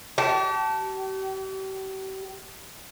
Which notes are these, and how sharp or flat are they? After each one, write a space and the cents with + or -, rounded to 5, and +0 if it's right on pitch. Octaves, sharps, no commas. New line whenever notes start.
G4 -40 A5 +0